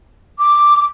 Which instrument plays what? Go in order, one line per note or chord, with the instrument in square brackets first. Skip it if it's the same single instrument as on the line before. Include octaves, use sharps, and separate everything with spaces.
[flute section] D6